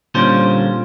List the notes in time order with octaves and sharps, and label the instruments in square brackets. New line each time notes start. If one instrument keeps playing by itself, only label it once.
[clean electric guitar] A#2 D3 G3 C#4 C5